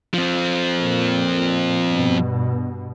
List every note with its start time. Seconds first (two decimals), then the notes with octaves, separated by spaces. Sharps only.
0.14 F3 C4
0.80 A#2
1.87 G2 B2